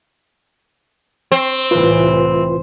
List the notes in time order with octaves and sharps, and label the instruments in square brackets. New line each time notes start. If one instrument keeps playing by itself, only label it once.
[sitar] C4
[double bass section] C2 A2 E3 [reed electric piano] F4 B4 C6